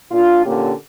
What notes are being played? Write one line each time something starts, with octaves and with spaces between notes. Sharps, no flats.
A#2 D4 F4
A#2 D3 A#3 C#4 G4